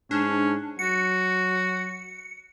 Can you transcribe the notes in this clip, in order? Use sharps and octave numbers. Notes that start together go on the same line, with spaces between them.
G#2 C#4 D4
F#3 F#4 C#7